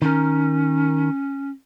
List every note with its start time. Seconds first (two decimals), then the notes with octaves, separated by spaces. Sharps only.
0.02 D#3 C#4 A#4